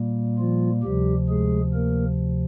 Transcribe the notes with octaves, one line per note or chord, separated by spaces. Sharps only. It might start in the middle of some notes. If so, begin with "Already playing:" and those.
Already playing: A#2 G3 A#3
F3 F4
D2 C3 F3 G3 G4
G#3 G#4
A#3 A#4